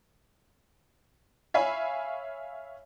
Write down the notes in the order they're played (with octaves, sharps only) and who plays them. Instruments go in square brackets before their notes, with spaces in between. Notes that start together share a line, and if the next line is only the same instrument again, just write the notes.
[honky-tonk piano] C#5 E5 F5 G#5 B5